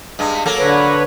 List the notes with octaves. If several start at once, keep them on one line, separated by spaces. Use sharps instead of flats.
G2 G#3
F#3 A#3 A4
D3 B4 C#5